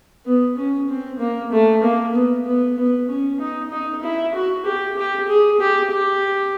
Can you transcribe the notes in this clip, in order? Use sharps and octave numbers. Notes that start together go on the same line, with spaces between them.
B3
C#4
C4
A#3
A3
A#3
B3
B3
B3
C#4
D#4
D#4
E4
F#4
G4
G4
G#4
G4
G4